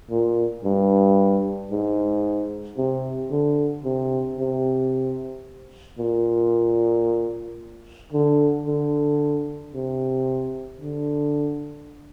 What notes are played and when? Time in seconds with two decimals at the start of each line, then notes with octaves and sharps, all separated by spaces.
0.10 A#2
0.64 G2
1.71 G#2
2.77 C3
3.31 D3
3.84 C3
4.39 C3
5.98 A#2
8.12 D3
8.66 D3
9.73 C3
10.80 D3